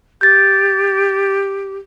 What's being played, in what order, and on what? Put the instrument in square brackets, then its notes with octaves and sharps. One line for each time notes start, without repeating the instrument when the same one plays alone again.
[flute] G4 [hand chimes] G6 A6